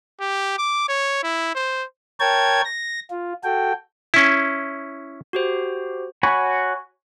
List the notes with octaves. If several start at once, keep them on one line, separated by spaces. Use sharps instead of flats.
G4
D6
C#5
E4
C5
A#4 C#5 G5 A5 G#6
A#6
F4
F#4 A4 G5
C#4 E4
F#4 G4 C5
F#4 C#5 G#5 B5